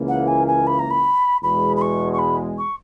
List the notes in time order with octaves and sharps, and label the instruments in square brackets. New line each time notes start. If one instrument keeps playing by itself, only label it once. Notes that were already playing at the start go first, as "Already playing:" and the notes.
Already playing: [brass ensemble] C#2 C#3 E3 A#3 E4
[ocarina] F#5
G#5
G#5
B5
A#5
B5
[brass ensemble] E2 B2 G#3 [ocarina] B5
[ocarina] B5
C#6
C#6
B5
C#6